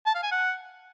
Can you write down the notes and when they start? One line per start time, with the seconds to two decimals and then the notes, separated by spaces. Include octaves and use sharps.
0.07 A5
0.15 F5
0.23 G#5
0.32 F#5